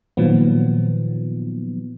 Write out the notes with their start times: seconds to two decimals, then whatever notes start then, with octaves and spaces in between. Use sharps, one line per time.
0.17 A#2 D#3 F3 F#3 B3